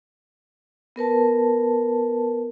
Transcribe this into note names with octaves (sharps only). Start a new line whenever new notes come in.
B3 A#4 B4 A5